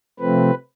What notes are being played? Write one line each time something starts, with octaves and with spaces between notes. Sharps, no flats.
C3 F3 A3 C4 B4